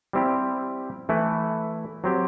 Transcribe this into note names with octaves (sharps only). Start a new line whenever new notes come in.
G3 C4 E4 G4
E3 A3 E4 B4
F#3 C4 G4